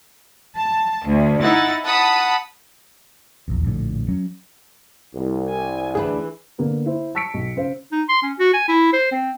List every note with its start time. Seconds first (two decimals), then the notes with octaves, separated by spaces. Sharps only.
0.56 A5
1.06 D2
1.41 D#4 E4 F#5 A6
1.84 F#5 A5 B5 D#6
3.48 D#1 A#1 E2
3.65 A#1 F2 A2 D3
4.08 F#3 C#4
5.14 C2
5.49 G#5
5.95 D2 E3 D4 G#4 B4
6.58 D3 A#3 B3
6.86 E4 C5
7.15 A5 C#6 E6 B6 C#7 D7
7.34 B1
7.56 C#3 C5 F5
7.92 D#4
8.09 C6
8.22 C#4
8.39 F#4
8.53 G#5
8.68 E4
8.93 C5
9.12 C4